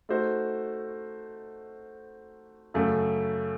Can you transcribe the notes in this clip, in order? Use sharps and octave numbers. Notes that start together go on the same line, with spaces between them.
A3 D#4 F#4 C5
F#2 C#3 A3